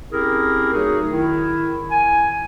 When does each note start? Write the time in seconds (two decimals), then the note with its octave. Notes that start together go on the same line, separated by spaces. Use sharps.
0.11 C4 C#4 E4 G4 G#4 A#4
0.73 F#3 A3 D#4 F#4 G#4
1.10 D#3 E4
1.90 G#5